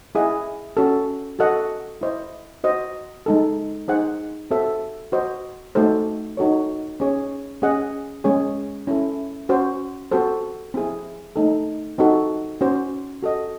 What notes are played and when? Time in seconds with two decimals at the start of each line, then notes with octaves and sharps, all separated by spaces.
0.15 E4 G#4 D#5 F#5
0.77 C#4 F#4 A4
1.39 F#4 A4 D#5 F#5
2.01 E4 C5 D#5
2.64 F#4 C5 D#5
3.26 G#3 D#4 A4
3.88 D#4 G#4 C5 F#5
4.51 C4 F#4 A4 C5 E5
5.12 F#4 C5 D#5
5.75 A3 D#4 F#4 A4 C5
6.37 D#4 F#4 A4 C#5
7.00 C#4 G#4 C#5
7.62 C#4 G#4 D#5 F#5
8.24 G#3 C#4 G#4 C#5
8.87 C#4 E4 A4
9.49 C#4 F#4 C5
10.11 C4 F#4 A4 C5
10.74 C4 E4 G#4
11.36 A3 D#4 A4
11.98 C4 D#4 F#4 A4
12.61 C#4 F#4 C5
13.23 F#4 A4 D#5